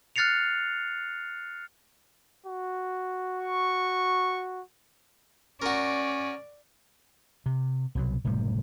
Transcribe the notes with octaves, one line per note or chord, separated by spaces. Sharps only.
F6 F#6 A6 C7 C#7 F7
F#4
C#6
C#4 F#4 A#4 D5
C3
C2 B2 F#3
F#1 A2 C3 G3